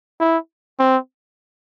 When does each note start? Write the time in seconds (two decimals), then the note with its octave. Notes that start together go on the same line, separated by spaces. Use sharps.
0.20 E4
0.79 C4